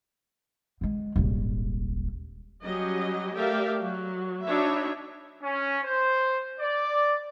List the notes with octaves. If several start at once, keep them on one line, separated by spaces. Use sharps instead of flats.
D3 G#3
D#1 G#1
F#3 G3 C#4 G4 D#5
A3 G4 A#4 D5 E5 F5
F#3
D4 D#4 F#4 C#5 E5 B5
C#4
C5
D5